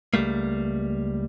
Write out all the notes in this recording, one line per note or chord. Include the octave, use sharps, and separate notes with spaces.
C#2 G3 A3 A#3